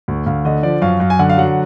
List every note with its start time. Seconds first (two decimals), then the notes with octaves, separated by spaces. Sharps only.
0.08 D2
0.26 D2 F5
0.45 D3 D#5
0.63 F3 D5
0.82 F#2 F5
1.00 F#2
1.10 G#5
1.19 D3 F#5
1.29 F5
1.38 F#3 F#5